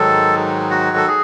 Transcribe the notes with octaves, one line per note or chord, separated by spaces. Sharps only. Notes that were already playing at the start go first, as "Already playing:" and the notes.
Already playing: G#2 D#3 F#3 A4
F#4
A4
G#4